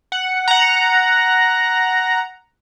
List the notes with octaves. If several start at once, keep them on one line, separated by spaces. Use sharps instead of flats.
F#5
F#5 A#5